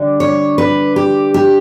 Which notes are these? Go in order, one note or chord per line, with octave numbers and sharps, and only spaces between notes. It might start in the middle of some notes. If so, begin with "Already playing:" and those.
Already playing: D3 G3 D4
C#5
B4
G4
G4